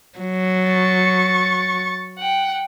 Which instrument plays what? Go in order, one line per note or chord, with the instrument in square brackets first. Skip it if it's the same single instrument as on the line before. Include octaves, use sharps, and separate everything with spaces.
[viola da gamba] F#3
[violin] C#6 A6
F#5 G5